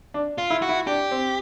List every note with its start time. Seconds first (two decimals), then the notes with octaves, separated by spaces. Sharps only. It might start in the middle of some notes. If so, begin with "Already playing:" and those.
0.14 D4
0.38 F4
0.50 E4
0.62 F#4
0.69 E4
0.87 D4 G4
1.11 C4